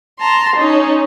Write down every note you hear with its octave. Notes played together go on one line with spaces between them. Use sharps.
A5 A#5 C6
C#4 D#4